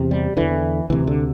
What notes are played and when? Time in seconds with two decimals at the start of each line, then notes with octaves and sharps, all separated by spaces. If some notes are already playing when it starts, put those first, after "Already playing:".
Already playing: E2 C3
0.11 G3
0.37 E2 D3 E3
0.90 D2 C3 E3
1.07 D3